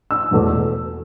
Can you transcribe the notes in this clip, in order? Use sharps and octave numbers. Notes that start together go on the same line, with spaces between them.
E6
E1 E2 B2 A3